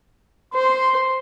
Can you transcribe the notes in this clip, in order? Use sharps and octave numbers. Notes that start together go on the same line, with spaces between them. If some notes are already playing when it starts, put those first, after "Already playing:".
C5 C6